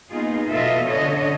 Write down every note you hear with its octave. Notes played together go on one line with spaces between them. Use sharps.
A#3 B3 D#4 F4 G#4
B2 E3 F4 A4 D#5 E5
D3 C#4 D4 A4 C#5 D#5